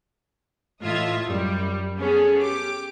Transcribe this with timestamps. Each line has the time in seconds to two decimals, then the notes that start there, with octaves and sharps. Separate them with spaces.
0.82 A2 E3 F4 D#5 E5 G#6
1.25 F#2 G3
1.99 B3 C#4 G#4 A4
2.41 G4 D6